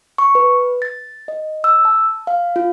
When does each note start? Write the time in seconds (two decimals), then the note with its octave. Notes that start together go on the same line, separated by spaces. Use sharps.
0.18 C#6
0.35 B4
0.82 A6
1.28 D#5
1.64 E6
1.85 A5
2.27 F5
2.56 F4